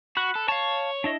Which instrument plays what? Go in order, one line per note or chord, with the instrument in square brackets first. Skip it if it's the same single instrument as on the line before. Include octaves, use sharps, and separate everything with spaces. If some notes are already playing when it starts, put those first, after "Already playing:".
[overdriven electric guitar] F#4 [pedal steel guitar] B5 F#6
[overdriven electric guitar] A4
[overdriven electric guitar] C#5 [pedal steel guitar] F5 A5
[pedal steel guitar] D4 E4 D#5